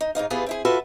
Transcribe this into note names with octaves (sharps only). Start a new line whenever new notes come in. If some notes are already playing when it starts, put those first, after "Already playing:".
D#4
G#2 E3 D#4 F5
B3 E4 F4 G4 G#4 B4
C4 E4 G#4
F4 F#4 A4 B4 E5